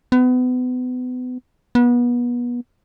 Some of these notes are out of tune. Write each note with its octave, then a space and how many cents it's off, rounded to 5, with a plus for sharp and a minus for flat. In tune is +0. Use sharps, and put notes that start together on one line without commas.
B3 +30
B3 -30